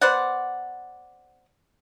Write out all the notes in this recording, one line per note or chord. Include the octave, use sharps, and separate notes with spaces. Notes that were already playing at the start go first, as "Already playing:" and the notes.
B3 C5 D5 F#5